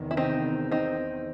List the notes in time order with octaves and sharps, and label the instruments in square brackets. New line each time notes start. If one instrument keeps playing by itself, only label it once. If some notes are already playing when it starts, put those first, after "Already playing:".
Already playing: [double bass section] E2 C3 D#3
[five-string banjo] E4
C4 D#4
C4 D#4